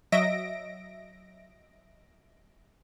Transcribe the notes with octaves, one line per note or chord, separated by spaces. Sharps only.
F#3 D#5 E5 A#6 D7